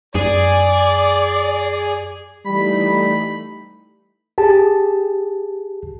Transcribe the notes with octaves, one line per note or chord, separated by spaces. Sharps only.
F#2 G#4 D5
E3 G3 A3 D#4 B5
G4 G#4 A5